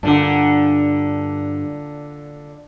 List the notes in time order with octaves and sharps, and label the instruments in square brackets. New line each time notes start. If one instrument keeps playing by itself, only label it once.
[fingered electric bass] G2 [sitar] A#2 D3 [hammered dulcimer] D4 F#5